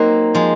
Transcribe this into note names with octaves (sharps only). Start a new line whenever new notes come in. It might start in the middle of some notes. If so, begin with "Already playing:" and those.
Already playing: F#3 A#3 C4 D#4
F3 G#3